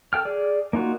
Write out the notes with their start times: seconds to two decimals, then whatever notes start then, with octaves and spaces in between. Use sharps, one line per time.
0.13 A4 G5 F6
0.25 G#4 D5
0.73 A#3 D#4 F4 F#4